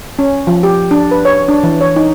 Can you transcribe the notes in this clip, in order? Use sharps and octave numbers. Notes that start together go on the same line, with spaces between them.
C#4
F3
G4
D4
B4
C#5
D4
E3
C#5
D#4